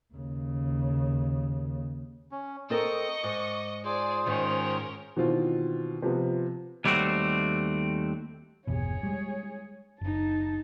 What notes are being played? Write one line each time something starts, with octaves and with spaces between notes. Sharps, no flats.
D#2 C#3
C#4
C4 A4 A#4 D#5 C#6 D#6
G#2 D6
F4 G#4 C5 D5 G#5
G#2 D#3 C#4 A#4
B2 D#3 E3 C4 F4
C3 F3 B3
D#2 G3 A3 C4 F#4
G1 E2 B2 G#4 C#5
G3 G#3
F#1 D#4 A5